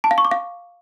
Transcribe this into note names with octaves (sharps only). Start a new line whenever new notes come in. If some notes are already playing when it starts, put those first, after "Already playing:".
A5
F5
C#6
D6
F5